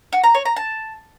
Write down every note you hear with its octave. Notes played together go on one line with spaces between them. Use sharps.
F#4
A#5
C#5
A#5
A5